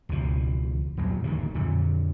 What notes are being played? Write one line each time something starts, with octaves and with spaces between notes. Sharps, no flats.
E1 C#2 E3 F3
E2 A#2 F#3
D1 D2 D#3 A#3
F2 A#2 D3